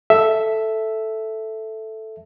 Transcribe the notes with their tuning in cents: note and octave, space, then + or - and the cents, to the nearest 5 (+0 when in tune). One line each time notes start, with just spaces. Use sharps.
A4 +0 E5 +0